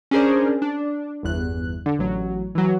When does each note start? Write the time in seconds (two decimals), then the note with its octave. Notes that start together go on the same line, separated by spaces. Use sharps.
0.11 C#4 D4 G#4 A#4 C5 D5
0.62 D4
1.23 G1 E2 F#6
1.86 D3
1.99 A1 F#3
2.55 E3 F#3